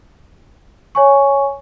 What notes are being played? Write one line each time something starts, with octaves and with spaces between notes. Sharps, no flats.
C#5 G#5 C#6